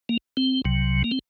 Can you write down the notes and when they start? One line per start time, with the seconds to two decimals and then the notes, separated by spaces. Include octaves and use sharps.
0.09 A#3
0.37 C4
0.65 C2 C3 F#3
1.04 A#3
1.11 C4